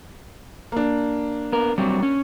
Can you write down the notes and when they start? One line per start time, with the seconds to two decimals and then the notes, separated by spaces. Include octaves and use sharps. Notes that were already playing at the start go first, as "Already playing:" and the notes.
0.72 A#3 D4
1.52 B3 A#4
1.78 F#3 G3 C4
2.03 C#4